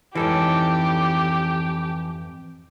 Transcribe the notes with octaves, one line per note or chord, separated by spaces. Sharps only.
F2 G#2 E3 C#4 G4 A4